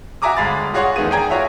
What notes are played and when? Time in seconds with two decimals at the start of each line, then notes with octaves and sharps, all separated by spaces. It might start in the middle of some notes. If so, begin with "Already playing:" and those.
0.22 F#4 E5 G#5 A#5 D6 D#6
0.37 G1 G#3 F5 B5 A6
0.73 F4 F#4 G#4 C#5 F#5 C6
0.96 E2 D#3 A3 B3 G#4 D#7
1.11 G#4 D5 G5 G#5 A#5 G#6
1.29 F4 F#4 C#5 E5 G#5